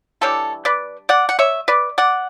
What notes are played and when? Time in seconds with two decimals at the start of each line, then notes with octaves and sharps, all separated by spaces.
0.21 E3 G3 D4 A4 C#5
0.65 B4 D5
1.09 D5 F#5
1.29 F#5
1.39 C#5 E5
1.68 B4 D5
1.98 D5 F#5